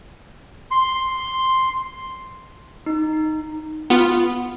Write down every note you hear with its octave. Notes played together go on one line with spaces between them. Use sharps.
C6
D#4
B3 F4